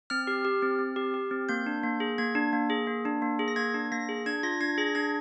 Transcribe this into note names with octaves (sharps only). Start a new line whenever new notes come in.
C4 F6
G4
G4
C4
C4
G4
G4
C4
A#3 G6
D4
A#3
G#4
A#3 G#6
D4
A#3
G#4
A#3
D4
A#3
G#4
A#6
A#3 G#6
D4
A#3 A#6
G#4
D4 G#6
F4 A#6
D4 G#6
G#4 A#6
D4 G#6